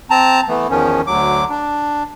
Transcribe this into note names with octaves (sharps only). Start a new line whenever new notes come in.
C4 A5 A#5
E3 A3 B3
E2 D#3 F3 C#4
D2 F#3 D6
D4